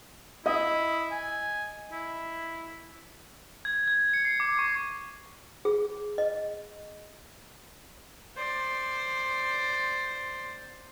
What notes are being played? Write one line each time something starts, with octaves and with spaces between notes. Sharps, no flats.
E4 D#5 D#6
G#5
E4
G#6
G#6
C#7
C7
D6
C#6
G#4
D#5
C5 D5